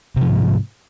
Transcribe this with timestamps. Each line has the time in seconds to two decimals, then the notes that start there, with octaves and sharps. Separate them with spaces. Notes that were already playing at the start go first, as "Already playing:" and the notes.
0.16 C3
0.21 F3
0.26 G#2